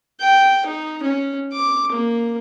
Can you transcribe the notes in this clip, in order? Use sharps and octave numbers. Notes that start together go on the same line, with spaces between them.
G5
D#4
C#4
D6
A#3